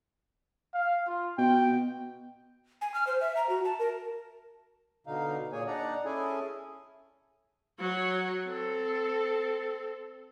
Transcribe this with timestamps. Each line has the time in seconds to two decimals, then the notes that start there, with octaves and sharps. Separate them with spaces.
0.74 F5
1.08 F4
1.38 B2 G5
2.81 G#5
2.94 F6
3.07 C5
3.21 E5
3.37 A#5
3.49 F#4
3.65 A5
3.79 A#4
5.07 B2 D3 D#4 F5
5.53 A#2 A#3 G#4 C#5 G#5
5.67 D4 D#4 D5 F#5 A#5
6.05 C#4 E4 G#4 A4 G#5
7.79 F#3 C#5
8.45 C4 A4